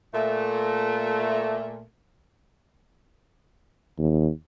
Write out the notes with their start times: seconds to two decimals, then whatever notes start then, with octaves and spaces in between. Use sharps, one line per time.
0.14 A#2 A3
3.98 D#2